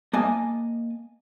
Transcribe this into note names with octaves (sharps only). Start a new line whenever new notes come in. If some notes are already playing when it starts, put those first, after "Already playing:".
A#3 D#5 G#5 A5